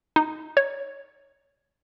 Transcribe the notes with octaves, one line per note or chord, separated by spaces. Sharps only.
D#4
C#5